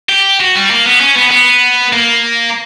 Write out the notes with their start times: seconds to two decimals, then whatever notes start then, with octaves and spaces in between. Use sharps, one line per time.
0.09 G4
0.40 F#4
0.56 G3
0.70 A#3
0.86 B3
1.01 C#4
1.17 B3
1.31 B3
1.93 A#3